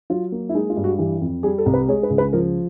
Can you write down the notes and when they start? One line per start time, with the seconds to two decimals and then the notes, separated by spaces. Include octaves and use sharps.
0.10 F#3 F4
0.32 A#3
0.49 E4
0.54 G#3 D#4
0.70 F4
0.76 G2
0.84 F#4
0.98 E3 G4
1.21 F2
1.43 G3 G#4
1.58 A4
1.66 C2
1.74 B4
1.88 G#3 C#5
2.03 B4
2.10 C#2
2.18 B4
2.33 F3 A#4